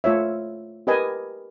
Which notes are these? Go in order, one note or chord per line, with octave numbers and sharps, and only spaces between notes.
A3 F4 C#5 E5
G4 A#4 B4 D#5 G#5